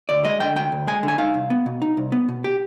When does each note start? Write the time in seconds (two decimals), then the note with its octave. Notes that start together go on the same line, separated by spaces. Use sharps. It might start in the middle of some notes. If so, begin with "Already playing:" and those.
0.09 D2 D5
0.25 G#3 D#5
0.40 D3 G5
0.56 D2 G5
0.72 D2
0.87 G#3 G#5
1.03 D3
1.08 G#5
1.18 D#4 F5
1.34 C2
1.50 B3
1.66 B2
1.82 D#4
1.97 C2
2.12 B3
2.28 B2
2.44 G4